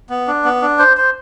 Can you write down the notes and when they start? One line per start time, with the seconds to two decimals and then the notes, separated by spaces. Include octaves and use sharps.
0.10 B3
0.28 D4
0.45 B3
0.62 D4
0.79 C5
0.97 C5